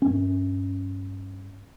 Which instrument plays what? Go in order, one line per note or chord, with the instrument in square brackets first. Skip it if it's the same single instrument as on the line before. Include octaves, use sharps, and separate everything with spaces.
[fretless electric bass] G2 C#4